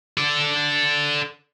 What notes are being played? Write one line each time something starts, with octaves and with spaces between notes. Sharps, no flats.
A4 D5